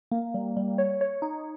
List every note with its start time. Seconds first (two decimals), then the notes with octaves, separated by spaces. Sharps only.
0.11 A#3
0.34 G3
0.57 G3
0.78 C#5
1.01 C#5
1.22 D#4